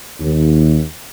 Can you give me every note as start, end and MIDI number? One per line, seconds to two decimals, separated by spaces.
0.19 0.79 39